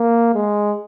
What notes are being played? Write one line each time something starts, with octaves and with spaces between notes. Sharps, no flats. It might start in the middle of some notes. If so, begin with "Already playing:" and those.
Already playing: A#3
G#3